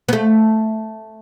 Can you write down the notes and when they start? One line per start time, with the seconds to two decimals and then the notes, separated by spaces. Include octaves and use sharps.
0.09 B3
0.13 A3